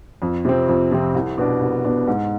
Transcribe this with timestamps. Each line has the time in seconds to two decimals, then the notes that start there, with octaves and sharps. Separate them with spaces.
0.22 F2
0.45 C3 F3 C4
0.68 F2
0.92 C3 F3 C4
1.14 C2
1.38 B2 B3 D4
1.61 C2
1.84 B2 B3 D4
2.07 G#2